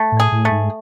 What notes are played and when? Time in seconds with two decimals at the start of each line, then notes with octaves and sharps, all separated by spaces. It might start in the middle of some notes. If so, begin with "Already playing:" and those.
Already playing: A3
0.12 A2
0.20 G#4
0.32 A2
0.45 A3
0.51 G#2